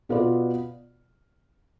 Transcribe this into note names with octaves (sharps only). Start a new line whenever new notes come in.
B2 B3 F4 B4 D5